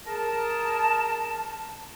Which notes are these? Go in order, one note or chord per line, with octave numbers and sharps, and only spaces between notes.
G#4 A#4 A5